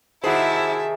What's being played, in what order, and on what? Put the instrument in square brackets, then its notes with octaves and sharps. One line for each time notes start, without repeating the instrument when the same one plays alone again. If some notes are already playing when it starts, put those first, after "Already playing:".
[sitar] C3 D#3 G#4 [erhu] E4 [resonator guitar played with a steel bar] F#4 C5 [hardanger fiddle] E5 A5